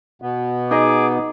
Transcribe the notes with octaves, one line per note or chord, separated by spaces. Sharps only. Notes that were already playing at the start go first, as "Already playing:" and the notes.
B2 B3
D#4 G#4 D#5 D6